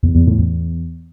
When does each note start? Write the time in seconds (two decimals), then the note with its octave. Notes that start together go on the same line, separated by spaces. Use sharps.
0.03 E2
0.15 E2
0.27 A2
0.39 E2